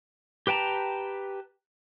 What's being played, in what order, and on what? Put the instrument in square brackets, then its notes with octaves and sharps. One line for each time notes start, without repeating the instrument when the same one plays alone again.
[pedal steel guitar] G4 B4 G5 A5 A#5